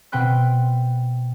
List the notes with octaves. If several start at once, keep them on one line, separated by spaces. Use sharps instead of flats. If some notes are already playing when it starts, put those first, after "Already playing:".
B2 C4 G5 B5 F#6